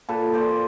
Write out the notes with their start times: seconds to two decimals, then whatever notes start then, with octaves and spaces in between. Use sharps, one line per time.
0.09 A#2 A4 B4
0.34 A#2 C5 D5